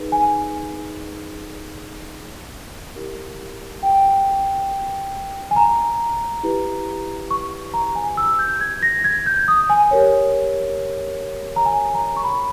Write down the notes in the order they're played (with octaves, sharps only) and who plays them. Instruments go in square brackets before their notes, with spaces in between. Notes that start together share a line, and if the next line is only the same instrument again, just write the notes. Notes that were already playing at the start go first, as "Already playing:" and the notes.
Already playing: [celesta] D#4 G#4 B4
G#5
E4 G4 A#4
G5
G#5
A#5
E4 G4 B4
C#6
A#5
G#5
E6
G6
G#6
A#6
G#6
G6
D#6
G#5
G4 A#4 C#5
A#5
G#5
A#5
C#6
B5